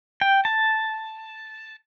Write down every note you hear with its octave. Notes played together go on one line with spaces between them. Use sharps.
G5
A5